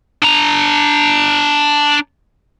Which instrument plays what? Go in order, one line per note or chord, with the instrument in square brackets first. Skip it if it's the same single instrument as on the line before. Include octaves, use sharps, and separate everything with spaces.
[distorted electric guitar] D4 A#5